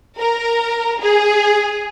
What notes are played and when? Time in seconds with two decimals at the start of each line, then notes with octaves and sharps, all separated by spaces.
0.19 A#4
1.02 G#4